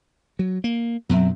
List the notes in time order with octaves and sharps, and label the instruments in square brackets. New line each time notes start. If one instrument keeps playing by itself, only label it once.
[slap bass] F#3
A#3
[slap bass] F#2 B2 [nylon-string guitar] F#3 C4 E5